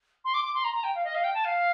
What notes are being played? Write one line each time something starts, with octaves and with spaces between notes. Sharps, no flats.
C6
D6
D6
C6
A#5
A#5
G5
F5
D#5
F5
G5
A5
F5